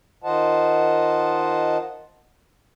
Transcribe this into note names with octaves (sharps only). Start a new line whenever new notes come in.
D#3 F4 C5 D#5 F#5 A5